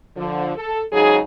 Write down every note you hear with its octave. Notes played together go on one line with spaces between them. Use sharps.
D3 F3
A4
G#2 C#3 F#3 D#4 G#4